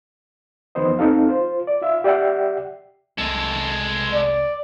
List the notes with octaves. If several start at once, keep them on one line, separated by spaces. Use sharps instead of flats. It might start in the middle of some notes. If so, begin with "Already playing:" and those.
E2 D#3 F3 B3 C5 D#5
D#2 C4 D#4 A4 F5
F4 C5
D5
F4 E5 F5
G4 D5 E5 F#5 G5
F1 C2 G#3 A4
D5